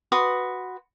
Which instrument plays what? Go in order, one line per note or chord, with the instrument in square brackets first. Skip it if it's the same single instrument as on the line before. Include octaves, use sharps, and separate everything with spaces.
[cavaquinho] F#4 B4 C6 D#6